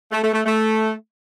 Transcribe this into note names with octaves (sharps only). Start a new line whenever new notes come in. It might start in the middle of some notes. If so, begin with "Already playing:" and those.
A3
A3
A3
A3